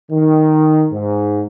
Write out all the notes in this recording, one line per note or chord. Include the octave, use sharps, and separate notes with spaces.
D#3
G#2